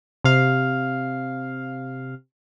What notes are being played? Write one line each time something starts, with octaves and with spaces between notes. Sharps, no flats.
C3 F5